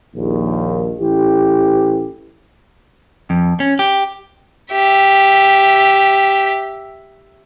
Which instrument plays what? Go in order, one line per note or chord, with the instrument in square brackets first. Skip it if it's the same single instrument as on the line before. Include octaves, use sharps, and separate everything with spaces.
[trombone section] A#1 D#2
A1 E3 G4
[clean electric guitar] F2
C#4
G4
[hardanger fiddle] G4 E5